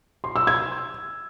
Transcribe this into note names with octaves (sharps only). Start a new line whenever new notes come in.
C6
E6
G#6